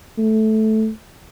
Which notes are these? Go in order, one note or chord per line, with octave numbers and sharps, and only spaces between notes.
A3